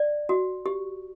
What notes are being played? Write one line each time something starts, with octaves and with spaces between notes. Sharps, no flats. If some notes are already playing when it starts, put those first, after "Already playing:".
Already playing: D5
F#4
G4